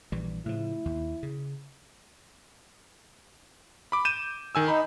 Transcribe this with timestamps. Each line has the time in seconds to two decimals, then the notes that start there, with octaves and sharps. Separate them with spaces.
0.12 A#1 E3 G3
0.46 A2 C#3 F3 E4
0.85 D#2
1.23 C#3
3.92 B5 D6
4.05 G6 D#7 E7
4.55 D#3 G#5 E6
4.68 D#4 B5